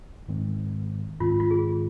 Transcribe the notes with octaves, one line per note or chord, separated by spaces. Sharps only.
G#2 D#3 G#3 C4
G#2 D#3 G#3 C4 F4
F4
G#4